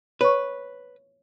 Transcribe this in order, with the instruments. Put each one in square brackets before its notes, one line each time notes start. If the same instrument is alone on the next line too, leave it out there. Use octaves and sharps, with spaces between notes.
[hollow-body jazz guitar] B4 [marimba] C#5 C#6